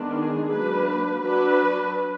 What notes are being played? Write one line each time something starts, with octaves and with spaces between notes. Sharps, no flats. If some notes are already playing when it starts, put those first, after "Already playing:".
Already playing: D#3 G#3 B3 D4
G#4
F#3 A#3 D4 B4
F#3 D4 B4